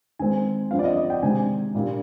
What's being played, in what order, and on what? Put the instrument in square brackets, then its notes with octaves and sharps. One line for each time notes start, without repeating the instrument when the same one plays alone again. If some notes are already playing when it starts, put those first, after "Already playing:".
[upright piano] D#3 G#3 C4 G#5
G2 F3 C4 F4 F5
D5
D#5
D#5
G5
C3 D#3 G#3 C4 G#5
A#2 G3 A#3 D4 F4